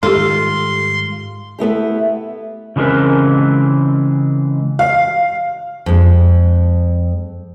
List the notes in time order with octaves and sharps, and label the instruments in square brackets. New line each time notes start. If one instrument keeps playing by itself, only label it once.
[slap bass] G#2 D#3 G3 [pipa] F4 [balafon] G4 A4 [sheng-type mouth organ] C6
[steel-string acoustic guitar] A3 B3 E4 G4
[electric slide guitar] C#3 E3 G#3 C4 A#4 B4
[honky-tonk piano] F5
[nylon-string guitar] F2 G#3